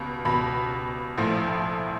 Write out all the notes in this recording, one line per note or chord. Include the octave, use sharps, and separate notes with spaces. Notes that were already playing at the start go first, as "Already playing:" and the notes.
Already playing: C#2 B2 G3
C#2 B2 G3 B5
A#1 A2 F3 A3